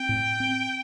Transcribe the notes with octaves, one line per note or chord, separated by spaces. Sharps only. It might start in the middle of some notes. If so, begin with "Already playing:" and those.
Already playing: C4 G5
A2
C4